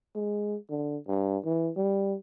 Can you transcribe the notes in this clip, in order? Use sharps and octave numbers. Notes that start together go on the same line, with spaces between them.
G#3
D3
G2
E3
G3